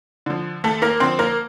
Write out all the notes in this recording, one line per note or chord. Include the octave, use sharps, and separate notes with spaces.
D3 F3
D#2 A3 A4
A#3 A#4
D3 F3 C4 C5
A#3 A#4